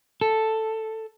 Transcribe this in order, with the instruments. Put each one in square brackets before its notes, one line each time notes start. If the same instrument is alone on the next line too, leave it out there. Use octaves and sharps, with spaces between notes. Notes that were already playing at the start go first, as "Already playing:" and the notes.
[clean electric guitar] A4